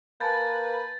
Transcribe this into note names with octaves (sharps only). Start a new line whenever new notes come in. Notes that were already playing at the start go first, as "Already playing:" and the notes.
A#3 B4 G#5 A5 B5 G6 A6